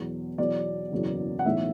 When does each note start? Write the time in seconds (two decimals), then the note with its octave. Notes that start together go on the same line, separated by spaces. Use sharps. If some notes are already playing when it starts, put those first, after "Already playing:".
Already playing: E2 B2 F#3
0.38 E2 B2 F#3 D5
0.92 F#1 E2 B2 F#3
1.39 F#5
1.45 B1 A2 E3 E5